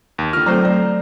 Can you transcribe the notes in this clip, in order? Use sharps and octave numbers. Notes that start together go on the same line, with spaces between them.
D#2
D3 F4 F6
F#3 A3 C4 A4 C5 A#5
D5